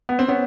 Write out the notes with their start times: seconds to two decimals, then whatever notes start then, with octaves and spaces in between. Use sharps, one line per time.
0.09 B3
0.19 C4
0.28 B3 C#4